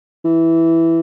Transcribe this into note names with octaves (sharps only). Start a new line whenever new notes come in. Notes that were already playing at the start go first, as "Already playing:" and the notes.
E3